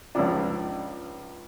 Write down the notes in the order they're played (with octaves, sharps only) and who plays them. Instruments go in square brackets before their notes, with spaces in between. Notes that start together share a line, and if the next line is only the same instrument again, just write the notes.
[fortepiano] C#2 C#3 F3 D4